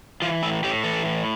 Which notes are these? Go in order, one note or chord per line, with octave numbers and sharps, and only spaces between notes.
E3 F4
A2 E4
A2 G4
E3 A4
A2